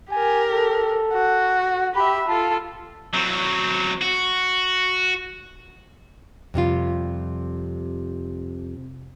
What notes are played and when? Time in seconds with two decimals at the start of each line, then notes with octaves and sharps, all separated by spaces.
0.11 G4 A#4 G#5
0.52 A4
1.13 F#4
1.96 G4 E5 B5
2.28 F4 A4 A5
3.14 F#3 C4
4.02 F#4
6.54 F2 C3 G3 F4